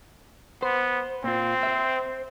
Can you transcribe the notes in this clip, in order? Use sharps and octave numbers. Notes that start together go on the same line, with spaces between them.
B3 C5
A#2 C4 F4
C5 E5